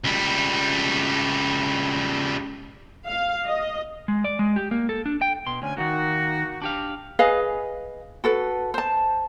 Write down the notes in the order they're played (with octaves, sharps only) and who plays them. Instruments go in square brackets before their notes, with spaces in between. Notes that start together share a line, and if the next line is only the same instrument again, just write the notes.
[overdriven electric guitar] C#2 G3
[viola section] F5
D#5
[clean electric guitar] G#3
D5
G#3
G4
A#3
A4
D4
G5
B2 C6
[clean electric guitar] D2 [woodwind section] C#4 G#5
[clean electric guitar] D2 D#3 [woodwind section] A#3 D#4 F#4
[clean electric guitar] D4 G4 F5
[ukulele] G#4 B4 D#5 F5
F#4 A4 B4
C5 A5